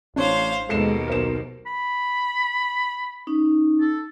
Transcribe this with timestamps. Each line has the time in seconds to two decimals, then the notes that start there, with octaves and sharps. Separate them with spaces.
0.16 A1 D4 C5 C#5 F5
0.69 D#2 B2 G#3 A4 C7 E7
1.08 B1 A#4 C5 E7
1.67 B5
3.27 C#4 D#4
3.81 A4